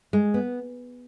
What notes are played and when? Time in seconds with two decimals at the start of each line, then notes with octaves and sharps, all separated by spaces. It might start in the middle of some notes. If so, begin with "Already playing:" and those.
0.13 G#3
0.34 B3